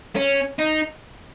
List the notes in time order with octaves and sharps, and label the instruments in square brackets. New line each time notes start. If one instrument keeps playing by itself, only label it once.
[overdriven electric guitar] C#4
D#4